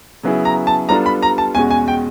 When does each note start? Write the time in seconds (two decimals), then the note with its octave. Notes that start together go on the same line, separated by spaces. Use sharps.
0.23 C#3 F#3 B3 E4 G#4
0.45 A#5
0.67 A5
0.89 G3 B3 D4 F4 A4 A#5
1.06 B5
1.22 A#5
1.38 A5
1.55 E2 B2 G#3 C#4 F#4 G#5
1.71 G#5
1.88 G5